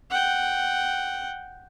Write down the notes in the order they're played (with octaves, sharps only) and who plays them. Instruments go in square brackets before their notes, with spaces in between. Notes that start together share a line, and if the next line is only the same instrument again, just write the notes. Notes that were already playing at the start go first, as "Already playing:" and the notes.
[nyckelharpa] F#5 G5